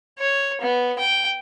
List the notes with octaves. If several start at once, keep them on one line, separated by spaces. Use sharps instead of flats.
C#5
B3
G5